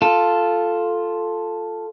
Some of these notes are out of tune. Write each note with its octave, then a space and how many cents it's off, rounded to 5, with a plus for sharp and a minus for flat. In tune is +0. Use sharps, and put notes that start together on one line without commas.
F4 +0 A4 +0